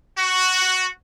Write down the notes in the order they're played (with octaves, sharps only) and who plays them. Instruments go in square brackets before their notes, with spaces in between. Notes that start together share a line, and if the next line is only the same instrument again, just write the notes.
[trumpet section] F#4